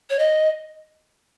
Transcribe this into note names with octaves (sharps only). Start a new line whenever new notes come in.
C#5
D#5